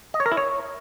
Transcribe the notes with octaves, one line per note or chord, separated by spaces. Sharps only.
D#5
C#5
A#4
E4
C#5